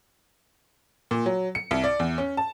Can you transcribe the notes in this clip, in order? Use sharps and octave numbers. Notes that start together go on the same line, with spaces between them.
A#2
F#3
C#7
C2
D5
E2
C#4
A5